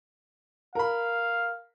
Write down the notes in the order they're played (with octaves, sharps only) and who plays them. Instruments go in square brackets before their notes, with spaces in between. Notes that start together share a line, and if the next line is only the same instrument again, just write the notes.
[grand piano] A#4 B5 [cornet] F5